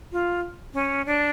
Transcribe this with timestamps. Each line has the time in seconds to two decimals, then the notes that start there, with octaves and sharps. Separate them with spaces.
0.12 F4
0.74 C#4
1.06 D4